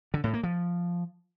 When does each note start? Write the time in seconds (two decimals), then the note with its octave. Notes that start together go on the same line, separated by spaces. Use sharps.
0.14 D3
0.24 A2
0.34 A#3
0.43 F3